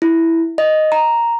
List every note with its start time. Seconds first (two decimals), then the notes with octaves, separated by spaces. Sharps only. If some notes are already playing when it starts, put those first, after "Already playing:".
0.02 E4
0.58 D#5
0.92 A#5